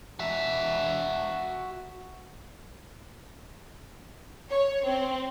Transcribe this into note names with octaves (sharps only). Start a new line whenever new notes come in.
F#4 E5
C#5
C4